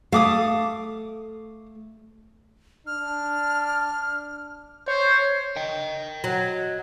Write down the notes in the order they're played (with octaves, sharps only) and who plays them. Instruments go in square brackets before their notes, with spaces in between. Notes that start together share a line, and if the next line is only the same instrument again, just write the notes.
[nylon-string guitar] A3 [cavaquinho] F5 D6 D#6
[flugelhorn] D4 [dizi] F6
[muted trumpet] C5 [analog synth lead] C#5
[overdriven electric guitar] D#5 G5
[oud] F#3